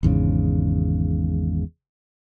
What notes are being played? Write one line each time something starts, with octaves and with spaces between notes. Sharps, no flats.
G#1 E2 G#2 C#3